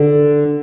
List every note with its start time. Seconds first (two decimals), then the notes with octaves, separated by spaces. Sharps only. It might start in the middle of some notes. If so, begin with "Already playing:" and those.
Already playing: D3